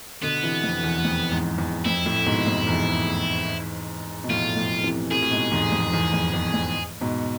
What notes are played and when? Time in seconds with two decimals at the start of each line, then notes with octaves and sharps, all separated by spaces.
0.22 B2 D3 B3
0.43 C3 E3
0.64 F2
0.83 E2
1.04 F2
1.30 E2 G#2
1.58 E2
1.85 F2 E4
2.06 F2 A2
2.26 G#2 B2
2.46 F2
2.67 E2 G#2
4.24 B2
4.29 F2 A2 F4
4.57 F2 A2
4.84 C3 E3
5.11 A2 C3 G#4
5.22 A2
5.31 G#2 B2
5.51 E2 G#2
5.72 F2
5.93 E2
6.13 F2
6.34 E2
6.54 F2
7.01 G#2 B2